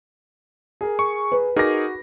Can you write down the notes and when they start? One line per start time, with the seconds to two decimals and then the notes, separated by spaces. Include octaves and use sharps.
0.81 G#4 A#4
0.99 C#6
1.32 B4
1.56 D#4 F#4 G#4 A#4 D6 A#6